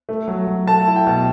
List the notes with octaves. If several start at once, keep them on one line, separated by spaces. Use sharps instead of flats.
A3
F#3
F#3
A3 A5
E4
G5
B2